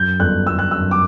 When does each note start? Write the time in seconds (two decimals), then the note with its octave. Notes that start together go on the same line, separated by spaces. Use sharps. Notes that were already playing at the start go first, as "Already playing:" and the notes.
Already playing: F#2 F#3 G6
0.19 G1 F#6
0.47 G1 E6
0.59 F#6
0.71 F#2 E6
0.91 D6